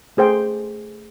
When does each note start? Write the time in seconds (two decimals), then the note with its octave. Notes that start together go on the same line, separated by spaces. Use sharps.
0.17 A3 G#4 C5 G5